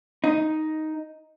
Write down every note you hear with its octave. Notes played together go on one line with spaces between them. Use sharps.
D#4